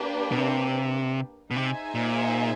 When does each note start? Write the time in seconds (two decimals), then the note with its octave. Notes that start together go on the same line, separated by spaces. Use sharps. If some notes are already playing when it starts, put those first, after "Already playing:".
Already playing: A#3 D4 G4 B4
0.31 B2
0.38 C3
1.51 B2
1.55 C3 D#4 G#4 C5 E5 G#5
1.95 A#2